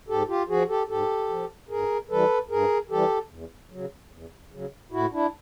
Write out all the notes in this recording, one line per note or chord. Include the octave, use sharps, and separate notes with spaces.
G#2 G4 A4
F4 G4
F3 F#4 G#4
G4 A4
G#2 G4 A4
F3
G2 G#4 A#4
E3 G3 A4 B4
G2 G#4 A#4
E3 G3 G4 A4
E2
C#3 F#3
E2
C#3 F#3
A2 E4 F#4
D4 E4